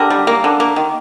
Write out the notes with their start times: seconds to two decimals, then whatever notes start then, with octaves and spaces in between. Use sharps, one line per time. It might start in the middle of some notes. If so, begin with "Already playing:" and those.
Already playing: D3 G4 A#4
0.10 G3
0.27 A#3
0.44 D3
0.60 A#3
0.76 D#3